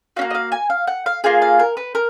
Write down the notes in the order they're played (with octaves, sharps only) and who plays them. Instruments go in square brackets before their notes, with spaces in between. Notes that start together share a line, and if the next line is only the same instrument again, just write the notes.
[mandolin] C#4 F#4 F5
A#3
D#5
F5
G#5
F5
F#5
F5
A#3 F4 G#4 F5
F5
A#4
B4
A#4